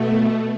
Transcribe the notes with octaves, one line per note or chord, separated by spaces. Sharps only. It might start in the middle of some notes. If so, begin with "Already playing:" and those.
Already playing: B2 A3